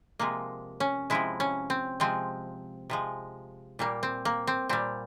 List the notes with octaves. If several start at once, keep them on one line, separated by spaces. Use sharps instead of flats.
C3 F3 G#3 A#3
C#4
C3 F3 G#3 E4
C#4
C4
C3 F3 G#3 C4
C3 F3 G#3
A#2 G3 A#3
C4
A#3
C4
A#2 G3 C4